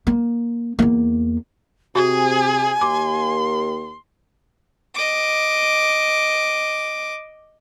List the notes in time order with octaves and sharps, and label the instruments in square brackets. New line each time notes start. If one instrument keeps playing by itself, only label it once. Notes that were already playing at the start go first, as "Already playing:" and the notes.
[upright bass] A#3
E2 A#3
[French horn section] C3 [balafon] F#4 [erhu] G#4 [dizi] G#5
[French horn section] D#2 A#3 G4 [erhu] C6 [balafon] D6
[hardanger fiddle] D#5 D6